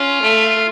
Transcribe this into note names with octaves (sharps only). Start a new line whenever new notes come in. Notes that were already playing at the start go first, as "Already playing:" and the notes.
Already playing: C#4 F4
A3